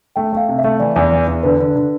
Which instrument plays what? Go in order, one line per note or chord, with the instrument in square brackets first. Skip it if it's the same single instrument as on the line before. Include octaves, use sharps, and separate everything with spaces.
[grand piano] A3 [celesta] G5
[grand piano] A3 [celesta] F5
[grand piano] C3
[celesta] E5
[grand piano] A3
[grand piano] E3 [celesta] D5
[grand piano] E2
E3
E2
[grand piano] D3 [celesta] B4
[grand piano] D3
D3